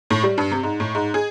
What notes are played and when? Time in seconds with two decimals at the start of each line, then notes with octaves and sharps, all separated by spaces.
0.10 A2
0.23 G3
0.38 G2
0.52 C3
0.63 G#2
0.80 A2
0.95 G#2
1.14 G#4